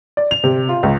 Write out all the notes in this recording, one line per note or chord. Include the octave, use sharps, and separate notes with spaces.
D5
F7
C3
F4
C#2